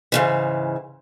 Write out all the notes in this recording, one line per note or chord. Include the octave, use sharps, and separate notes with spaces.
G#2 C#3 E3